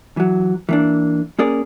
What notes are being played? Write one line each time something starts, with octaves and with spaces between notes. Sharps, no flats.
E3 F#3
E3 A#3 D4
A#3 C#4 G#4 A#4 D5